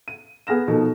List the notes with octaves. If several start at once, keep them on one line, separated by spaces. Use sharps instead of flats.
D#7
B3 G#4 F6 A#6 E7
B2 F3 D#4 A4 A#4